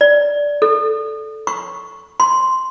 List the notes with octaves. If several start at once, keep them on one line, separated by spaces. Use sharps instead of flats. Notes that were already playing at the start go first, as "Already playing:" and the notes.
D5
A4
C#6
C6